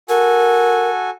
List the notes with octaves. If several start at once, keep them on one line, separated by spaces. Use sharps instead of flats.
F#4 A4 A#4 G#5